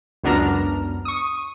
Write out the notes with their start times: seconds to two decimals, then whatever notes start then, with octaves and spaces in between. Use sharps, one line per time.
0.23 C#2 F#2 B3 D4 A#5 F6
1.05 C#6 D#6